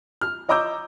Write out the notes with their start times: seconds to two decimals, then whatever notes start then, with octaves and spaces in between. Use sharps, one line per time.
0.21 F6
0.49 C#5 D#5 A#5 D6 E6 G6